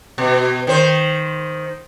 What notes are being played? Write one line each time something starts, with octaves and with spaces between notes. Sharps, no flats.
B2
D#3 C5